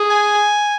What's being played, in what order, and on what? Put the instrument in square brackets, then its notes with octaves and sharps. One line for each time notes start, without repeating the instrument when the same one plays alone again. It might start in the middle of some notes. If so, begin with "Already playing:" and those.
Already playing: [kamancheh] G#4
[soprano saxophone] G#5